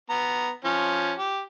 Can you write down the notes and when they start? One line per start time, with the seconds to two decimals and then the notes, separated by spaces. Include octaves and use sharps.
0.10 B3 A#5
0.65 F3 C#4
1.19 G4